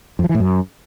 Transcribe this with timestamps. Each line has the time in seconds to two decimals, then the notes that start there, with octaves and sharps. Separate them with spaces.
0.19 F2
0.24 F3
0.29 E3
0.35 A2
0.40 F#2